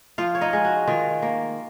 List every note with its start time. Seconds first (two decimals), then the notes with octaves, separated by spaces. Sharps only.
0.18 F3 F4 F5
0.35 C#5
0.41 D#4 D#5
0.53 G#3
0.65 F#4
0.87 D#3 F4
1.22 A#3